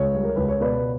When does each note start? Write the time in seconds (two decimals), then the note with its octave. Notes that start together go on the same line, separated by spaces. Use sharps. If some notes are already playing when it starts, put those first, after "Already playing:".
Already playing: C#2 C#5
0.14 G3
0.23 A#4
0.36 C#2 B4
0.48 C#5
0.60 B2 B4 D5